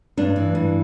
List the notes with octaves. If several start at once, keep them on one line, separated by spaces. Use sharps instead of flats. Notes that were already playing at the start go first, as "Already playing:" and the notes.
G2 D4
E3
G2